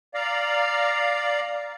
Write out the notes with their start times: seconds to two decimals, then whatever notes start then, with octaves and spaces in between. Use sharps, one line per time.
0.14 D5 F5 A#5